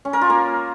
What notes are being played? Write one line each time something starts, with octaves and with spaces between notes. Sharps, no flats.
C#4
A#4
F4
A#3